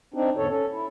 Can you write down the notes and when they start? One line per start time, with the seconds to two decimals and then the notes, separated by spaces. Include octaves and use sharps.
0.14 C4 D4 D#4
0.36 E2 G#2 D3 A4 C#5
0.49 C#4 A4
0.71 E4